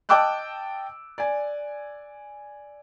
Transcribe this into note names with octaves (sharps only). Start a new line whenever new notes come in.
D#5 G5 A5 D6 E6 F#6
D5 G#5